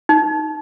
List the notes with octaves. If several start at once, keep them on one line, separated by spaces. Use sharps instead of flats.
D#4